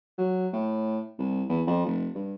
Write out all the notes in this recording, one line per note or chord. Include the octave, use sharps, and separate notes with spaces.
F#3
A2
C2
E2
F2
F1
G2